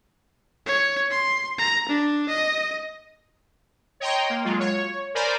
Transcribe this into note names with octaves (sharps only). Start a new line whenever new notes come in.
C#5
C6
A#5
D4
D#5
C#5 D#5 G5 A#5 C6
A#3
F#3 G#3 F4
C#5
A#4 C5 D5 G#5 A#5 B5